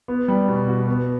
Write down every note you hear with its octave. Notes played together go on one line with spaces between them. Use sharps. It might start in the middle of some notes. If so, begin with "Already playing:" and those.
B3
G3
B2
F#4
B3